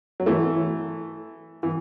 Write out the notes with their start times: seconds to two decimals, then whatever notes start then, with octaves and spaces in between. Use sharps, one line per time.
0.20 F#3
0.26 E3 A3
1.63 E3